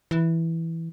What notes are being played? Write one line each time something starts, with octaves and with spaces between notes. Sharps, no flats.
E3